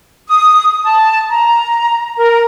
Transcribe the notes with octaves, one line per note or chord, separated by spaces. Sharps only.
D#6
A5
A#5
A#4